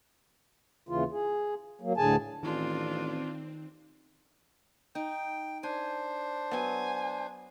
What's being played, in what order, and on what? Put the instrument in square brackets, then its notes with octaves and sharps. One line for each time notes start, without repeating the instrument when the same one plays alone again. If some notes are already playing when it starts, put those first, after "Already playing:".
[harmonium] D#2 C#3 E3 F4
G#4
F#3 A#3
D2 A2 D3 G#4 G#5 A5
[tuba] A1 [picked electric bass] D#3 [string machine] C4 [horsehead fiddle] D4 F4
[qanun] D#4 [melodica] G5
[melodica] D4 C5 [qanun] G#5
[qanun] F#3 B3 [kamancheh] G#5